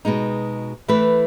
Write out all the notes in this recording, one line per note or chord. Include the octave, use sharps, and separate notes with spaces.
B2 G#3 D#4
E3 A3 E4 B4